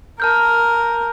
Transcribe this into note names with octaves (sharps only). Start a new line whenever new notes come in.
A#4 A5 F6 G6